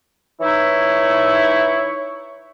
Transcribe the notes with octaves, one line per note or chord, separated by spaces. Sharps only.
E3 D#4 E4 C#5